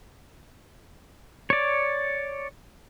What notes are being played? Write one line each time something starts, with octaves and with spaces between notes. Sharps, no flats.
C#5 D5